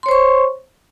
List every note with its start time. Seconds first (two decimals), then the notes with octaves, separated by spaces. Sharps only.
0.03 C6
0.06 C#5
0.09 C5
0.11 C#6